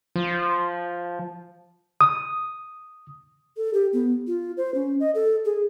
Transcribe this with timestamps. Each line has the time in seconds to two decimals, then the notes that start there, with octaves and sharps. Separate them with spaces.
0.16 F3
2.01 D#6
3.57 A4
3.74 G4
3.93 B3
4.27 F4
4.57 C5
4.74 C#4
5.00 D#5
5.15 A4
5.45 G#4